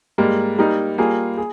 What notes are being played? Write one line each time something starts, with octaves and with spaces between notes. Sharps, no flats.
G#2 G3 A#3
G3 A#3 D#4
G3 A#3 F4 G#4
G#4